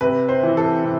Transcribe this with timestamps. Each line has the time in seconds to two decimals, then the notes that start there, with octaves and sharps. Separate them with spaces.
0.01 C3 B4
0.29 C5
0.43 E3
0.57 A4
0.84 C3